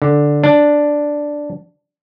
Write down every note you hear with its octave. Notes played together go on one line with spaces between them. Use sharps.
D3
D4